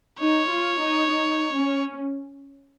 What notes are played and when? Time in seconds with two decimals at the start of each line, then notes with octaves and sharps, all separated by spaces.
0.20 D#4 C#5
0.49 F4
0.80 D#4
1.10 D#4
1.55 C#4